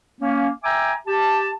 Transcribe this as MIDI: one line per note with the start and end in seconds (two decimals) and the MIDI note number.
0.21 0.49 58
0.21 0.49 61
0.64 0.93 76
0.64 0.93 79
0.64 0.93 80
0.64 0.93 82
0.64 0.93 86
0.64 0.93 88
1.07 1.52 67
1.07 1.52 81